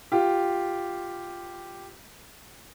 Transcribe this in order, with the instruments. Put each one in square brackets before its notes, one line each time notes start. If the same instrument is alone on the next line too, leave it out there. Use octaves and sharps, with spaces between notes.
[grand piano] F4 G4